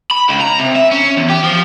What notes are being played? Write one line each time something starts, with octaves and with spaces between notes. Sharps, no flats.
B5
C#2
A#5
C3
E5
C#4
E2
G4
F3